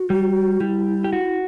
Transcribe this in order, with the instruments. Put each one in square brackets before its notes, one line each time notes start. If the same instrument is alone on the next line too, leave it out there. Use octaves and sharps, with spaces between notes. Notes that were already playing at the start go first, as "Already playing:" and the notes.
Already playing: [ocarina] F#4
[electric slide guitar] G3
[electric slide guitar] G3 [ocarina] E4
[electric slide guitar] G4
F#4